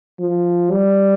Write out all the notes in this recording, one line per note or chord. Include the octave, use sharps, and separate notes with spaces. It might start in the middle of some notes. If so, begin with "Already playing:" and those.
F3
G3